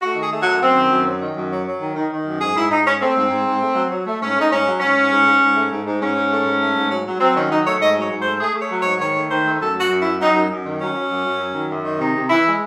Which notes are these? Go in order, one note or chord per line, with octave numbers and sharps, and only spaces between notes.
A3 F#4
D#3 G#4
A3
F#4
F#2
F#2 C4
D#3
F#2
F#3
D#3
F#2
F#3
F#3
D#3
D#3
D#3
F#2
G#2 G#4
G#2 E4
G#2 D#4
G#2 C#4
A3 C4
G#2
G#2
G#2
A3
F#3
F#3
A3
G#2 C#4
A3
D#4
G#2 C#4
F#3
G#2 C#4
G#2
G#2
G#2
G#2
A3
G#2
G#2
G#2 C#4
G#2
A3
G#2
A3
G#2
F#3
F#3
F#3 C4
D#3 C#4
F#3 D#4
A3 C#5
G#2 D#5
F#3
C#5
G#2
C5
A3
A3 G#4
A3
C#5
F#3
G#2 C#5
D#3 C#5
A3
D#3 C5
A3
F#2 A4
F#3 F#4
F#2
F#3 E4
F#3 D#4
F#2
F#2
D#3
F#3 C#4
F#3
F#2
F#2
F#3
D#3
F#2
D#3
C3 D#4
C3
E3 E4
G#3